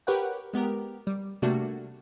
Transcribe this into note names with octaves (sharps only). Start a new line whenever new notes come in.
G4 A#4 B4 C#5 F#5 G5
G#3 B3 G4 A#4
G3
C3 G3 A3 A#3 D4 F#4